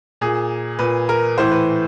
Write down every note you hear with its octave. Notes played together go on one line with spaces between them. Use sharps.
A#2 G#4
A#2 B4
A#4
A2 E3 C5
B4